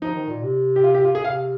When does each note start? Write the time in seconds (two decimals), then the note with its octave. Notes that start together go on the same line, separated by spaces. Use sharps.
0.02 F3 D#4
0.15 D#3
0.29 A#2
0.43 C3
0.76 G4
0.84 F4
0.94 G4
1.04 F4
1.15 G#4
1.24 C3 F5